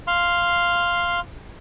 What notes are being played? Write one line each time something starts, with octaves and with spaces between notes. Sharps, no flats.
F5 C6